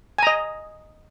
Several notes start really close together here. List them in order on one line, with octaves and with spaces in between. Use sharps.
G#5 A#5 D#5